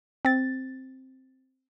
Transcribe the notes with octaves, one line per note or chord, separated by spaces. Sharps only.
C4 A6